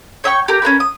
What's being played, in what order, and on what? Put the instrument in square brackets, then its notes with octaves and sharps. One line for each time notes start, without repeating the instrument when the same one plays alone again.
[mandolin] C#5 E5 G5 C#6
G4 A#4
C#4 D4 A#4 B4
D#6